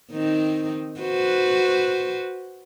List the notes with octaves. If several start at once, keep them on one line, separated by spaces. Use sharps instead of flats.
D#3 C4 D#4
F#4 B4 C5